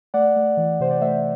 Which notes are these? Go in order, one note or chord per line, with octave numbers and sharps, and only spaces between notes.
A3 D5 F#5
A3
E3
C3 C5
D5
A3 C5 E5